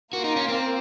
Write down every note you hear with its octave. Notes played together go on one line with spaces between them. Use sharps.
A#3 F4 F#4 A#4
D#4
C#4
C4